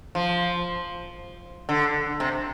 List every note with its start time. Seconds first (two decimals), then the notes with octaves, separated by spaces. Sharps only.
0.15 F3
1.69 D3
2.20 C3